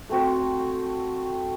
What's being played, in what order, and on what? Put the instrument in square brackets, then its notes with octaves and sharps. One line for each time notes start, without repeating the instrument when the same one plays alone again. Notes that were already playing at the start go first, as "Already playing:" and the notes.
[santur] A3 C4 F#4